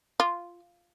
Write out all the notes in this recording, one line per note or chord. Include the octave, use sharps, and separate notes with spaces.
F4